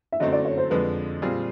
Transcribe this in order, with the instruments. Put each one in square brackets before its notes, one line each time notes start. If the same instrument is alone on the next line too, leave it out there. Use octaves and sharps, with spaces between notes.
[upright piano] E5
[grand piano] F#2 D3 F#3 A3 C4 [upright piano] D#5
[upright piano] D5
C#5
C5
[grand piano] F2 D3 F3 G#3 [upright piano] B4
[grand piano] A#2 G3 C4 F4 G#4